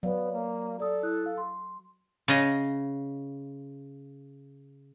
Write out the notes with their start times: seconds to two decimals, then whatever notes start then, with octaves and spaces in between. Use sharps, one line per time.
0.03 F#3 B3 D5 F5
0.33 A#3
0.80 A4 D5 D#6
1.03 E4 D#6 F#6
1.26 F5
1.38 C6
2.28 C#3 D#5